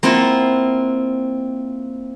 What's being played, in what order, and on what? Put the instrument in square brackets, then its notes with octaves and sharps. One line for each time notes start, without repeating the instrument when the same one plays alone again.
[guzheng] A#3 C4 E4 F4 F#5